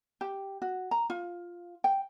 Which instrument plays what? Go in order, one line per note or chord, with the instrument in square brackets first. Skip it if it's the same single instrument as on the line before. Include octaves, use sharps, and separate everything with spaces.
[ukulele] G4
F#4
A#5
F4
G5